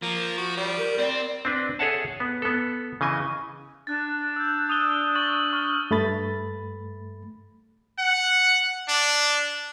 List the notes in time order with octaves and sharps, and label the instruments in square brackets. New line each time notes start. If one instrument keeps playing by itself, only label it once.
[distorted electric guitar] F3 [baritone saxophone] A#3
[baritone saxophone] F#4
G3
[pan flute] A#4
[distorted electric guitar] C4 [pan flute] D5
[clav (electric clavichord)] C4 D4 B4
G#4 A4 C#5 E5 F#5 A5
B3
B3 A4
C#3 E3 D#5 G#5
[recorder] D4 [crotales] F#6 A6
[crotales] E6 G6
D#6 D#7 G7
C#6 A6 F#7
C#6 F6
[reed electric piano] G2 A3 B5 A6
[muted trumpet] F#5
D4